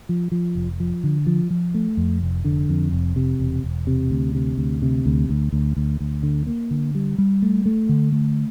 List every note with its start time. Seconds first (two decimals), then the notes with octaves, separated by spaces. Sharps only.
0.09 F3
0.32 F3
0.55 F1
0.80 F3
1.04 D3
1.26 F3
1.50 F3
1.74 A3
1.97 F2
2.22 F1
2.45 D3
2.69 F2
2.92 F1
3.16 C3
3.39 E1
3.64 E1
3.87 C3
4.10 D2
4.35 C3
4.57 D2
4.82 C3
5.05 D2
5.29 D2
5.52 D2
5.76 D2
6.00 D2
6.23 D3
6.47 A#3
6.71 D3
6.95 G3
7.18 G3
7.42 A3
7.66 A3
7.89 D3
8.12 A3